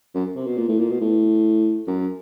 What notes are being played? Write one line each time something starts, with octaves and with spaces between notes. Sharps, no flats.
F#2
C3
B2
A#2
A2
A#2
B2
A2
F#2